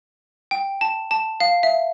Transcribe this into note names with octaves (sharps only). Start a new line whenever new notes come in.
G5
A5
A5
F5
E5